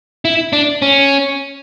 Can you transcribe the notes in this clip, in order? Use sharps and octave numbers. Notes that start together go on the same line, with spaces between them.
E4
D4
C#4